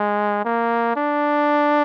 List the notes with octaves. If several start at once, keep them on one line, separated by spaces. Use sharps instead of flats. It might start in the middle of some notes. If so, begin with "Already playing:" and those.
Already playing: G#3
A#3
D4